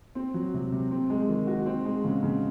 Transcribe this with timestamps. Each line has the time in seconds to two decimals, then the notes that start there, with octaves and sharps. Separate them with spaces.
0.15 C4
0.34 F#3
0.54 C3
0.72 C3
0.91 C4
1.10 G#3
1.29 D#3
1.47 F#4
1.66 C4
1.85 G#3
2.04 C#3
2.23 C#3